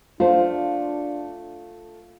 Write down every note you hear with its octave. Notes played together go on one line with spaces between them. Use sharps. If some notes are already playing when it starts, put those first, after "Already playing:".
A3 D4 F4 C5